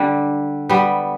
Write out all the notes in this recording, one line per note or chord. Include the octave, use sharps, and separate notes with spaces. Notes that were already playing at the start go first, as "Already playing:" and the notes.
Already playing: D3 G3
G3 B3